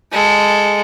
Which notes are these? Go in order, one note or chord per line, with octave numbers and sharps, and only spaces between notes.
G#3 A4